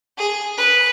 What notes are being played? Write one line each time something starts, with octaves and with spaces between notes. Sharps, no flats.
G#4
B4